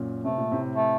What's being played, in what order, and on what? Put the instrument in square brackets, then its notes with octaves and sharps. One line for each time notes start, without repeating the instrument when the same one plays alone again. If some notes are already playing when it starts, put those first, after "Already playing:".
Already playing: [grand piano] F#2 A#2
[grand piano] C3 [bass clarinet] A3
[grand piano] A#2
A2 C3
[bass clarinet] A3